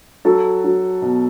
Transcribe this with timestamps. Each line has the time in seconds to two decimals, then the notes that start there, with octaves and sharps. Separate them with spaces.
0.25 F#3 A4
0.64 F#3
1.02 B2